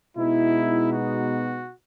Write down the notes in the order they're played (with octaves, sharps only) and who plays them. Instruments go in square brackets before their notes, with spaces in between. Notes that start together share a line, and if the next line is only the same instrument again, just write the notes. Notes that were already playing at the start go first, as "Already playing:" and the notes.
[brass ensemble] B2 G#3 B3 D#4 E4
F#4